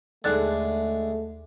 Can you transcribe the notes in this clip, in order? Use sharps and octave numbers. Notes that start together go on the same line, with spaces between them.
D#2 D3 G#3 A3 F#6 A6